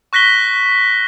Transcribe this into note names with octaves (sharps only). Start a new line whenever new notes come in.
C#6 F#6 A#6 B6 G7